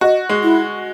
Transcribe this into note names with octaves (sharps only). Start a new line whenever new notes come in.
F#4 D#5
G#3
E4